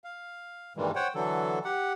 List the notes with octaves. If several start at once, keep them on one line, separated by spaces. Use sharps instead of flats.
F5
G2 A#2 D#3 E3 G3 G#3
C5 C#5 F#5 G5
D3 E3 F#3 A4
G4 F#5